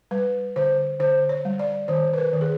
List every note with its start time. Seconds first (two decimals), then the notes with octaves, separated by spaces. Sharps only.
0.11 G3 B4
0.56 D3 C5
1.00 D3 C5
1.29 C#5
1.45 G3
1.59 D5
1.88 D#3 C5
2.13 B4
2.18 A#4
2.33 D#3
2.41 G#4